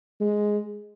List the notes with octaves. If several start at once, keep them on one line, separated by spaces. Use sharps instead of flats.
G#3